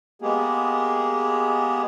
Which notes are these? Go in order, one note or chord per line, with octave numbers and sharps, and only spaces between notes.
G#3 A#3 B3 G4 G#4